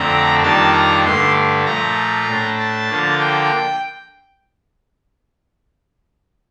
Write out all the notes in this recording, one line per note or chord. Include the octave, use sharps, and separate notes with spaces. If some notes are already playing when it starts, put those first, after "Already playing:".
Already playing: F2 D3 A3 C4 A#5
F2 D#3 G3 A#3 D4 A5
A#5
G2 D3 A3 C6
A#2 F3 A3 A#5
A2 A3 D4
A5
D3 F3 A#3 D4
G5